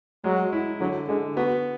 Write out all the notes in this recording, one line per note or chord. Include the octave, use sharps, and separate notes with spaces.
F#3 G#3
E4
D3 F#3
D3 G#3
B3 F#4